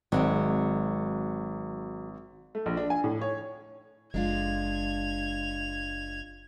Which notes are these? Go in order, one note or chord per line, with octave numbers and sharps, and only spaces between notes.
G#1 F#3 G#3 C4
A3
A#1
D4
G#5
A2
C#5
F#1 G#3 D4 F4 G#6 F7